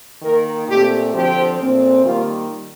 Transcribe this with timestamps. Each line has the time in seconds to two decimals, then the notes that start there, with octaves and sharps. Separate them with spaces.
0.22 D#3 A#3 A#4
0.68 A#2 A3 C4 G4
1.13 D3 F3 C4 G4
1.59 A#2 A3 C4
2.04 D#3 G3 A#3 F4